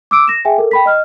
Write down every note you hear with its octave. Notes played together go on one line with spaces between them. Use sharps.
D6 E6 D7
A#6 E7
G#4 E5 G5 G#5
A4 A#4
G5 B5 B6
D#5 F6